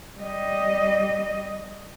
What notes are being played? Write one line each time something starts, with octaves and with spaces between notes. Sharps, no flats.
G3 D#5